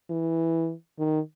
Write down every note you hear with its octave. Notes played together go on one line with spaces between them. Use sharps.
E3
D#3